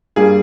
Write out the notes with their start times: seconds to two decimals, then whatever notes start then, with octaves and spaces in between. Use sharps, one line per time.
0.16 G2 G3 A#3 G#4